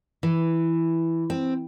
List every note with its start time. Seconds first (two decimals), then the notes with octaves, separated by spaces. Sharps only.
0.23 E3
1.30 C4